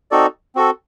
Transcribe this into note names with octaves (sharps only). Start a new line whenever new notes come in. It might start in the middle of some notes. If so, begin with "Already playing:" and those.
C4 D#4 F#4 A4 D5
C4 F#4 A4